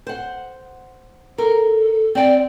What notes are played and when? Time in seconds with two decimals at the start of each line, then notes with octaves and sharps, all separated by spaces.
0.07 C5 F#5
1.38 A4 A#4
2.15 C4 D5 G5